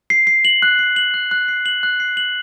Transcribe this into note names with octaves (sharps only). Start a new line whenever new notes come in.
C7
C7
F#7
F#6
C7
F#7
F#6
F#6
C7
F#7
F#6
C7
F#7